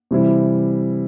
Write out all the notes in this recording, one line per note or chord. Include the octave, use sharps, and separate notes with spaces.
C3 E3 G3 C4 E4